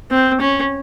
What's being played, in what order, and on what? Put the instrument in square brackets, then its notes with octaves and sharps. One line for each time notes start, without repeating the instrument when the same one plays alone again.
[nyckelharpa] C4
C#4